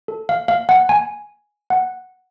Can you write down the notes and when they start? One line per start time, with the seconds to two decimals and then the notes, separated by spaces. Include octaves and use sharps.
0.08 A4
0.29 F5
0.48 F5
0.69 F#5
0.89 G#5
1.70 F#5